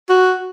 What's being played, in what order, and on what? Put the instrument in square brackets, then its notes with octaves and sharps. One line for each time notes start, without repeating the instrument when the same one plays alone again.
[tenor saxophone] F#4